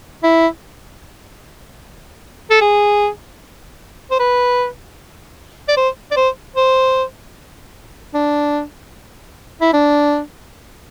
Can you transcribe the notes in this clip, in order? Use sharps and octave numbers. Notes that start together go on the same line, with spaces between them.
E4
A4
G#4
C5
B4
D5
C5
D5
C5
C5
D4
E4
D4